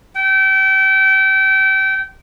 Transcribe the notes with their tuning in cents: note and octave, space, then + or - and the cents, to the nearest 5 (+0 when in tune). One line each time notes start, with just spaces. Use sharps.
G5 -30